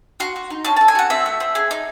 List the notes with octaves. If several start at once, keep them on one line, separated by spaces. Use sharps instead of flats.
F#4 C6
F#4
D#4
C#4 A5
A4 A5
G#5
F#4 F#5
C4 E5
A3
C4
G#4
D#4